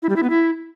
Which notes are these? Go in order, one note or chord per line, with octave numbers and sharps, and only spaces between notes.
E4
G3
E4
B3
E4